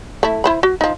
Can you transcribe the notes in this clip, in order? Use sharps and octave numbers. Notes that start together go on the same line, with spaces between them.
A3 E4
E4 C5 B5
F#4
F3 D#4